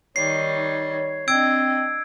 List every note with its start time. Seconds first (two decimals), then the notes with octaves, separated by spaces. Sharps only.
0.16 D#3 G3 D#4 C#5 C7
1.28 C4 D4 D#5 E6 G#6 D7